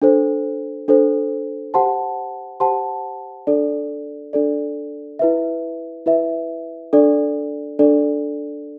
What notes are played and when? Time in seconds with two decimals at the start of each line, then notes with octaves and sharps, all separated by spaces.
0.02 D4 A4 C5
0.88 D4 A4 C5
1.74 G4 C5 F#5 A5 C6
2.60 G4 C5 F#5 A5 C6
3.47 D4 A4 D5
4.33 D4 A4 D5
5.19 E4 B4 E5
6.06 E4 B4 E5
6.93 D4 A4 D5
7.79 D4 A4 D5